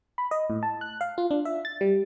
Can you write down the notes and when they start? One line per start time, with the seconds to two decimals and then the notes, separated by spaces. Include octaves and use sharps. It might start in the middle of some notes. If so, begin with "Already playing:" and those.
0.18 B5
0.31 D#5
0.50 A2
0.63 A5
0.81 F#6
1.01 F5
1.18 F4
1.31 D4
1.45 E5
1.65 A6
1.81 G3